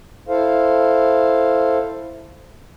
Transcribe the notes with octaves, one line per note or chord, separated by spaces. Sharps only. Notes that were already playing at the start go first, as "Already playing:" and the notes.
E4 A4 C5 F5